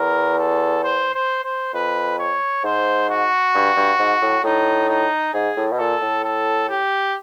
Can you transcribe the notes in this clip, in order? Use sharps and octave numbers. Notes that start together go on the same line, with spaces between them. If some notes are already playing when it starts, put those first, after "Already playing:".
Already playing: E2 A#4
A4
C5
C5
C5
F2 B4
C#5
G#2 C5
F#4
G2
G2
G#2
A2
A2 D#4
D#4
G#2 G#4
A2
B2
A#2 A4
A2
A4
G4